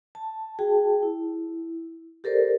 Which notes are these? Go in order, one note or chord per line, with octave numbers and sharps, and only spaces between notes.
A5
F#4 G#4 G5 A5
E4
G4 A4 A#4 C5 D5